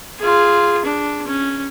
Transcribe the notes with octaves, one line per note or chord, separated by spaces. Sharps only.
F4 G#4
D4
C#4